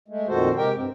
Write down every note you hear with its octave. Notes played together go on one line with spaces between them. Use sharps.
G#3 A3
F2 A#2 D#3 F#4 A4 C5
C3 G#3 G4 A#4 G5
G2 C4